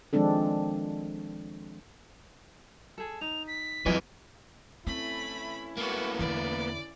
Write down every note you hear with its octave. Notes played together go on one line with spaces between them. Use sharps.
D#3 F3 G#3 C4 D4 A4
G#4 A4
D#4 F7
B6
F2 E3 F#3 F4 G#4 D#5
E3 A3 C4 C#4 E4 B5
A#3 B3 F#4 A4
E2 D3 D5